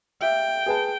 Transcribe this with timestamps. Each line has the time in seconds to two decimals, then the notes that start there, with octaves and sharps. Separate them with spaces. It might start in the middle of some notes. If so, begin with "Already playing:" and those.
0.22 G4 E5 F5 G5
0.66 G#4 B4 A5